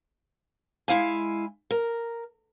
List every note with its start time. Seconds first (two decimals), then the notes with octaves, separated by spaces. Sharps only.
0.88 G#3 E4 F5 G#5
1.71 A#4